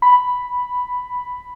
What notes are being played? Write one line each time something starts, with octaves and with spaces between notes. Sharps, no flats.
B5